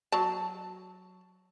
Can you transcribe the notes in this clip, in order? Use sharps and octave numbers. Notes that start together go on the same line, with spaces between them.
F#3 A5